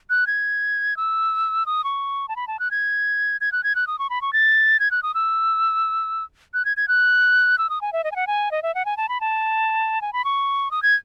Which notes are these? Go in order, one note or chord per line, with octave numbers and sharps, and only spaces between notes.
F#6
G#6
E6
D#6
C#6
A5
B5
A5
F#6
G#6
G#6
F#6
G#6
F#6
D#6
C#6
B5
C#6
A6
G#6
F#6
D#6
E6
F#6
G#6
G#6
F#6
E6
D#6
G#5
E5
D#5
G#5
F#5
G#5
D#5
E5
F#5
G#5
A5
B5
A5
G#5
B5
C#6
D#6
G#6